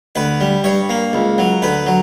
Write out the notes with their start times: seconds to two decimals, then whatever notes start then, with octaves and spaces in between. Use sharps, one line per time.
0.15 D2 B4
0.40 G3
0.64 G2 C#5
0.89 A#3
1.13 C#2
1.38 F#3
1.62 D2 B4
1.86 F#3